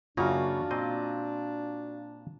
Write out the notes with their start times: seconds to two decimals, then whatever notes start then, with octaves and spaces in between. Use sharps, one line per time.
0.17 F#2 C#3 A#3 D4 F4 F#4
0.71 A#2 C4 D#5